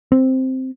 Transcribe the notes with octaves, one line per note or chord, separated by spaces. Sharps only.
C4